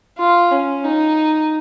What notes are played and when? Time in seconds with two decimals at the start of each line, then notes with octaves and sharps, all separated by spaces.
0.18 F4
0.51 C#4
0.84 D#4